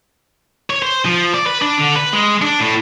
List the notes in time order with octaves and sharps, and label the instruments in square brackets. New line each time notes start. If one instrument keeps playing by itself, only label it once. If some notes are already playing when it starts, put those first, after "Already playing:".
[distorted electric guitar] C#5
C5
F3
D5
B4
D4
D3
B4
G#3
D4
A2